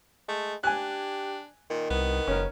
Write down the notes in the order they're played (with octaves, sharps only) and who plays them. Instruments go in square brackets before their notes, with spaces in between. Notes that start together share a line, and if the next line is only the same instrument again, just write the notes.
[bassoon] G#3 [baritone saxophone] A3
[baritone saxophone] D4 [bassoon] G4 [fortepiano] G#5 F#6
[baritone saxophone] A#2 [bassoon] D#3
[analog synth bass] C2 [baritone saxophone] B3
[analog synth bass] F#1 [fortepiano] C#4 A#4